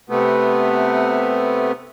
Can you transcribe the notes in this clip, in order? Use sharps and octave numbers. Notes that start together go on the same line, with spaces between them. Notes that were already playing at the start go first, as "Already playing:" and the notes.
C3 A3 B3